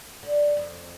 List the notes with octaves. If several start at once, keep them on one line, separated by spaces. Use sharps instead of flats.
D3
F2